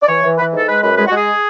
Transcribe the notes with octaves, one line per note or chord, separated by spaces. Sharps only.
D5
E3 C#5
E3
E3 B4
G#2 A4
G#3 B4
F#2 B4
G#3 B4
F#4
G#3
G#4